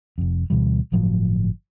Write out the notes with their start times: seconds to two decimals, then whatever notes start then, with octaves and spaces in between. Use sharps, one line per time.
0.18 F1 F2
0.50 D2 B2 E3 G3
0.92 G1 A2 F3 F#3